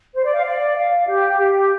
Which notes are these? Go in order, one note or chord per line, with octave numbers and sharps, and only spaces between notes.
C5
D5
F5
D5
F5
G4
G4